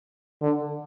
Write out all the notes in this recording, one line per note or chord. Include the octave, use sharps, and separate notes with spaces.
D3